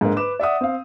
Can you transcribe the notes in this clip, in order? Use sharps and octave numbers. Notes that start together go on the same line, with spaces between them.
G#2 D3 A#3
B4 D6 E7
D5 E5 F#5 D#6
C4 F5